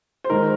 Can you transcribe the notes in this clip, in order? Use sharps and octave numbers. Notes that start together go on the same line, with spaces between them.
C5
G#2 D#3 A#4